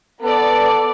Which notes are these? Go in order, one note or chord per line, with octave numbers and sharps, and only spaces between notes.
B3 A4 D5